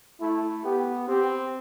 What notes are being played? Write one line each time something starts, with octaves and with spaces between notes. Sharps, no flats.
A3 E4
B3 G4
C4 G4